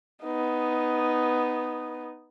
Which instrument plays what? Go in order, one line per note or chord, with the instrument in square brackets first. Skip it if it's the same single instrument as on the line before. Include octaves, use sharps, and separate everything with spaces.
[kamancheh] B3 D#4